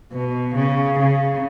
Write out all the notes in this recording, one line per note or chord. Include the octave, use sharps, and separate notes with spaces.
B2
C#3
C#3